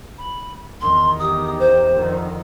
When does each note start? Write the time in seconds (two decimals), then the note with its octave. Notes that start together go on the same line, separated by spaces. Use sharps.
0.18 B5
0.81 E2 D#3 C6
1.19 G4 D#6
1.59 C5
1.94 F2 D3 D#3